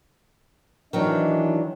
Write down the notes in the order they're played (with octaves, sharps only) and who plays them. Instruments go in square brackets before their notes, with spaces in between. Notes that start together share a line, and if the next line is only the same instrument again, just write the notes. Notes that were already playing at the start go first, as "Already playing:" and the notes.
[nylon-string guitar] D#3 F#3 [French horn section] E3 D#5 [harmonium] D4